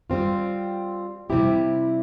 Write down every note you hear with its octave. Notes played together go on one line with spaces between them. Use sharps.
G3 C4 F4
C3 G3 C4 E4 G4